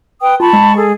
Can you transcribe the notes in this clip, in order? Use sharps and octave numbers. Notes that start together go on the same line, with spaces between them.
B4 G5 D#6
F4 A5 B5 C#6
G#3
G#4 A4